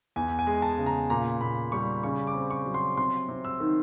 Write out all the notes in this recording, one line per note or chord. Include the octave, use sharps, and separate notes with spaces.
E2 G#5
G#5
G#3
A5
C#3
A#5
A#2 A#5
A#2 B5
G3 C#6
C#3 C#6
D6
C4
C#6
F#3
C6
C3 C6
C3
E6
D#3